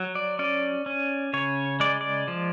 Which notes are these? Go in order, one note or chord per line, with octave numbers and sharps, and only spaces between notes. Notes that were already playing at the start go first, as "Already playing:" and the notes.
Already playing: F#3
D5
C#4 D5
C#4
C#3 C#5
G#3 D5
D5
F3